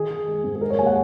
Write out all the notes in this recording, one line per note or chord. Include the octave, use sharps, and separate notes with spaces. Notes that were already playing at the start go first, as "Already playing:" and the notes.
Already playing: D#3 G#4
D#3
G#3
G#2
G#4
G#3 A#4
C#5
D#2 G#5
F#5